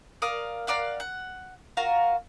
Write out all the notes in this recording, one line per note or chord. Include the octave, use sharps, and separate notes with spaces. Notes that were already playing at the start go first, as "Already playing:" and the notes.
A#4 D5 F5 D#6
A#4 D5 F5 F#5
F#5
F4 F#4 A#4 F5